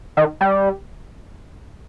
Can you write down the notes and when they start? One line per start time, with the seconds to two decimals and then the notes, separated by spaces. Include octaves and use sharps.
0.17 D#3
0.41 G3